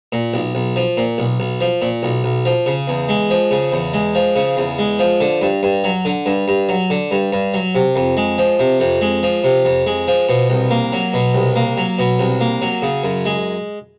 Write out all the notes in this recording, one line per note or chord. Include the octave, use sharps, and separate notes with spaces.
A#2
B1
B1
F3
A#2
B1
B1
F3
A#2
B1
B1
F3
C#3
E2
G#3
F3
C#3
E2
G#3
F3
C#3
E2
G#3
F3
D3
G2
G2
F#3
D3
G2
G2
F#3
D3
G2
G2
F#3
C3
F2
G#3
F3
C3
F2
G#3
F3
C3
F2
G#3
F3
B2
C2
A#3
F#3
B2
C2
A#3
F#3
B2
C2
A#3
F#3
C#3
F#2
G#3